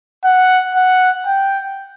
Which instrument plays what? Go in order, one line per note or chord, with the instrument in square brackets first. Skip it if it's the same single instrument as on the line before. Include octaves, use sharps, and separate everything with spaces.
[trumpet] F#5
F#5
G5